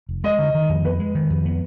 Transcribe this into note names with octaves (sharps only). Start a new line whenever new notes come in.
F1
G#3 D#5
D3
D#3
F2
B3 B4
G#3
D#3
F2
B3